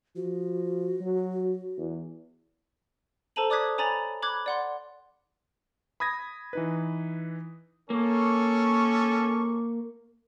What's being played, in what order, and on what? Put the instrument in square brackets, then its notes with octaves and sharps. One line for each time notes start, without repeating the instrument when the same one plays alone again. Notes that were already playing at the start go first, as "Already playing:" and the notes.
[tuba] F3 [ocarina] F#4
[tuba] F#3
E2
[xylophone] A4 C5 A5 A#5 D#7 F#7
D5 D6 D#6 F#6 G#6 B6
C#5 G#5 A#5 B5 A6 F7
B5 D6 F#6 G#6
D5 F#5 C6
[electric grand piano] B5 D#6 G#6 A#6
E3 D#4 B4
[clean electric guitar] A#3 [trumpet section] C#4 A4 C#6